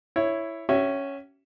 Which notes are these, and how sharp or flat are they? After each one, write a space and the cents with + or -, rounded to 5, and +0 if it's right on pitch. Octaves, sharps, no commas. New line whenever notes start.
E4 +5 C#5 +0
C#4 +0 F#4 +45 E5 +10